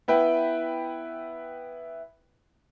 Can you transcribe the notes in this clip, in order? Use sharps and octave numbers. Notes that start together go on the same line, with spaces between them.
B3 E4 B4 G5